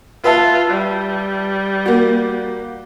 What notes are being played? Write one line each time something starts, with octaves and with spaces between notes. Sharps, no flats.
F4 B4 E5 A5
G3
A#3 F#4